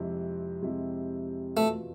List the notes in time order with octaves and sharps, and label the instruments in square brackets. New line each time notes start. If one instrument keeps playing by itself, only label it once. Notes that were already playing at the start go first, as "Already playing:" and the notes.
Already playing: [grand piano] F2 C3 G#3 C4 E4
F2 C3 G#3 C4 E4
[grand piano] E2 B2 B3 F4 [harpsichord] A3